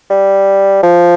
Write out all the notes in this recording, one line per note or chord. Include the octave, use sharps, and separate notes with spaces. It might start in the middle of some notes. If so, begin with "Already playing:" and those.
G3
F3